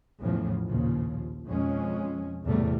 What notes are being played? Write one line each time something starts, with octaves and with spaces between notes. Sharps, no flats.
E2 A2 C#3 F3
A#1 D#2 C#3 F3
F2 B2 F3 G#3 C#4
E2 A2 C3 G3 A3